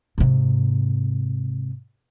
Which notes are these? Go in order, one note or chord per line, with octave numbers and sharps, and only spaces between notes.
G#2 C3